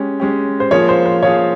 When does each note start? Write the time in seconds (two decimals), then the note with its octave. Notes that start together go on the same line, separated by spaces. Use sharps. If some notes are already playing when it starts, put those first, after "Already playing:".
Already playing: G#3 C#4 G4
0.20 G#3 C#4 G4
0.60 C5
0.71 F3 A#3 F4 G#4 C#5
0.89 C5
1.06 C5
1.23 F3 A#3 F4 G#4 C#5